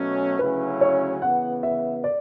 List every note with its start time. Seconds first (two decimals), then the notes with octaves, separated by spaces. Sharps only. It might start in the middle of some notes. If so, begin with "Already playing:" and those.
Already playing: B2 F#3 A3 C#4
0.39 D2 C#3 F#3 C#4 E4 B4
0.81 C#5
1.22 C#3 E3 B3 F#5
1.63 E5
2.04 D5